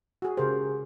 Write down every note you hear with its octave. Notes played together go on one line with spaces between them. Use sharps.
F#4 G#4
C#3 G4 G#4 A#4 C5